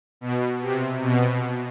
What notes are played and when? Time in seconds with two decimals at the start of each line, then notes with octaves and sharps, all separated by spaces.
0.21 B2
0.61 C3
1.02 B2